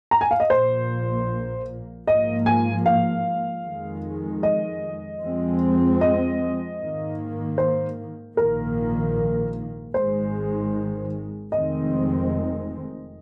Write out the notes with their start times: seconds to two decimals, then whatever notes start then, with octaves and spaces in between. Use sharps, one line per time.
0.11 A#5
0.21 G#5
0.31 F5
0.40 D#5
0.50 A#1 A#2 A#3 C5
2.07 G#2 F3 A#3 D#5
2.46 G#5
2.86 F5
3.65 F2 D#3 G#3
4.43 D#5
5.22 F2 F3 G#3 C4
6.01 D#5
6.79 G#2 D#3 A#3
7.58 C5
8.37 A#1 G#2 D#3 A#3 A#4
9.94 G#1 G#2 D#3 G#3 C5
11.52 F1 F2 D#3 G#3 C4 D#5